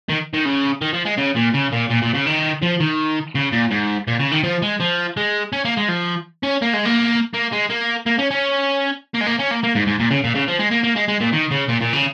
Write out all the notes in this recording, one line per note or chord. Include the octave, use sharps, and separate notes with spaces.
D#3
D#3
C#3
D#3
F3
G#3
C#3
A#2
C#3
A#2
A#2
A#2
C#3
D#3
F3
D#3
C#3
A#2
G#2
A#2
C#3
D#3
F3
G#3
F3
G#3
C#4
A#3
G#3
F3
C#4
A#3
G#3
A#3
A#3
G#3
A#3
A#3
C#4
C#4
A#3
G#3
A#3
C#4
A#3
A#3
G#2
G#2
A#2
C#3
A#2
C#3
F3
G#3
A#3
A#3
G#3
G#3
A#2
D#3
C#3
A#2
A#2
C#3